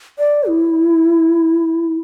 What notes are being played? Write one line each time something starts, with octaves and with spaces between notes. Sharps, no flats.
D5
E4